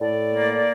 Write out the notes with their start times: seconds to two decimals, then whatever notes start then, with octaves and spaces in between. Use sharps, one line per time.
0.01 A2 D5
0.33 A#3